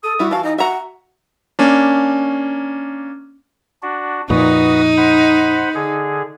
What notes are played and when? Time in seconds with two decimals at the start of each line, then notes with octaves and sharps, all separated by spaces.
0.04 A4 D#6
0.19 G3 E4 F#4
0.31 E3 F#4 F5 A5
0.44 D#4 D#5
0.58 F#4 E5 F#5 A#5
1.59 A#3 C#4 D4
3.82 D4 F#4
4.30 F2 A#2 D#4 F#4 B4 D#6
4.97 C5 F#5 B5
5.75 D3 G#4